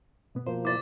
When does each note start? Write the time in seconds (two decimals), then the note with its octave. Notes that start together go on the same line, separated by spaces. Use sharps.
0.35 B2 B3
0.47 B2 F3 A#3 C5
0.65 E4 C5 D5 D6 A6